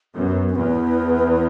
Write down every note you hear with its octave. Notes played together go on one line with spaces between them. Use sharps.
F#2 B3
C#4
E2 B3